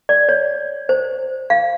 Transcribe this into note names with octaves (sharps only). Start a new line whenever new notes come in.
D5
C#5
C5
F5